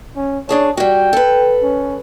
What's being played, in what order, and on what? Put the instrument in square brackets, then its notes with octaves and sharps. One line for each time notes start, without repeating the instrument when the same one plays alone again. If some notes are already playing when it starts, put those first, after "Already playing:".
[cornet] C#4
[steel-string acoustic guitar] D4 G#4 A5 [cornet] C#5
[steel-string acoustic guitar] G3 F#4 [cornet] G5
[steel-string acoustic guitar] A4 B4
[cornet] C#4